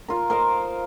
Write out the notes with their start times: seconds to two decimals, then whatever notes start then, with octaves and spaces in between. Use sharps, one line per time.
0.08 F4 A#4
0.30 A#4 C5 D#5 F5